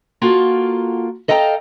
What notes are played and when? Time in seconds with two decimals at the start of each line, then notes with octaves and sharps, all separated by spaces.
0.22 A#3 F4 F#4 A4 F#5
1.28 A4 D#5 F5 G5 A#5